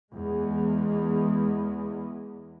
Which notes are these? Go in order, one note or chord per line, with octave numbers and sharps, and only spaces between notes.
E2 G#3